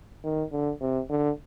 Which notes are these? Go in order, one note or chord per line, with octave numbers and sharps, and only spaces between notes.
D#3
D3
C3
D3